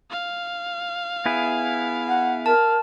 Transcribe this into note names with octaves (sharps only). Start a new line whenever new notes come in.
F5
B3 E4 G#4
F#5
A#4 A5